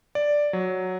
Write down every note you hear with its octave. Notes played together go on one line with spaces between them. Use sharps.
D5
F#3